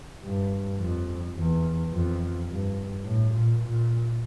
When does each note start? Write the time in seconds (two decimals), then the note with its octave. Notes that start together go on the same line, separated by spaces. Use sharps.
0.22 G2
0.79 F2
1.35 E2
1.92 F2
2.47 G2
3.04 A2
3.31 A#2
3.59 A#2